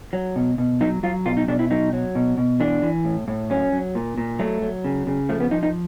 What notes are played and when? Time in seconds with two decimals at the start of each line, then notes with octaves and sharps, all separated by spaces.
0.13 F#3
0.36 B2
0.58 B2
0.81 F#3 D#4
1.03 F#3 F4
1.25 B2 F4
1.37 D#4
1.48 B2 D4
1.59 E4
1.70 F#3 D#4
1.93 F#3
2.15 B2
2.38 B2
2.60 E3 D4
2.82 E3
3.05 A2
3.28 A2
3.50 F#3 C#4
3.72 F#3
3.95 A#2
4.18 A#2
4.39 F#3 A3
4.62 F#3
4.85 C#3
5.07 C#3
5.29 F3 A3
5.40 B3
5.51 F3 D#4
5.63 D#4